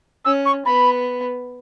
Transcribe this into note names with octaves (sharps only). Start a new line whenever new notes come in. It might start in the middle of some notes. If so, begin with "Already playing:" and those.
C#4 E6
C#6
B3 B5